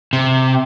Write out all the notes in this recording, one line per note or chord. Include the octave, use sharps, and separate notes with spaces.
C3